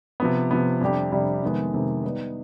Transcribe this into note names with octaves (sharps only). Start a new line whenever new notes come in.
C3 F3 B3
C3 F3 B3
F2 C3 G3 D4 G4
F2 C3 G3 D4 G4
F2 C3 D#3 G#3 B3
F2 C3 D#3 G#3 B3
G3 B3 D#4 B4